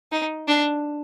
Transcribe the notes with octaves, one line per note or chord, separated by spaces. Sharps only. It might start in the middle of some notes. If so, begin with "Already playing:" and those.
D#4
D4